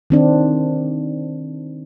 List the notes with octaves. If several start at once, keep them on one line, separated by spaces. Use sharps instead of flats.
D#3 C4 D4